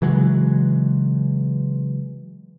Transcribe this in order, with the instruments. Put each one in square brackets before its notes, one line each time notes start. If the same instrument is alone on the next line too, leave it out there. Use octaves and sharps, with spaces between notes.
[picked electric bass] C#3 E3 F#3 G#3